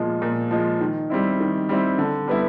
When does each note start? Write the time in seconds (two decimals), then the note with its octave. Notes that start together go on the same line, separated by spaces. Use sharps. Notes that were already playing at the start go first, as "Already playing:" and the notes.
Already playing: A#2 F3 G#3
0.22 A#2
0.51 F3 G#3
0.81 D#3
1.10 G3 C4 E4
1.40 D#3
1.69 G3 C4 E4
1.98 D3
2.28 G3 B3 E4